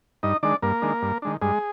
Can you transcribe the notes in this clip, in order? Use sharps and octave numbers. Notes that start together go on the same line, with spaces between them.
G2 D#4 D#5
D#3 G#3 D4 D5
G2 A#3 A#4
D#3 G#3 D4
G2
D#3 G#3 D4
G2 G#3 G#4